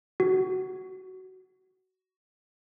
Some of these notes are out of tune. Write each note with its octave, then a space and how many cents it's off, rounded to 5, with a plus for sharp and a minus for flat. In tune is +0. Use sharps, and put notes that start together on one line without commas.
F#4 +15